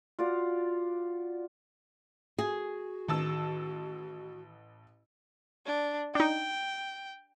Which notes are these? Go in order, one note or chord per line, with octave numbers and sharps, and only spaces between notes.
F4 F#4 D5 F5
F#4 G#4
A1 D#3 A5 E6
D4
D4 D#4 G5